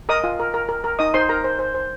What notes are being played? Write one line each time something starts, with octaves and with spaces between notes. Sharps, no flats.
A#4 D#5 D#6
F4
A#4
A#4
A#4
A#4
D#4 D#5 D#6
D#4 C5 C6
A#4 A#5
C5
C5
C5